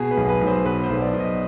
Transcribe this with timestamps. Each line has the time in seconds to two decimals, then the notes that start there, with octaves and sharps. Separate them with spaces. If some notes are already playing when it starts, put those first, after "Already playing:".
Already playing: B2 G#4
0.11 B4
0.17 B1
0.29 B4
0.41 B1
0.47 C5
0.65 B2 B4
0.83 C5
0.90 B1
1.02 D5
1.14 B1
1.20 D#5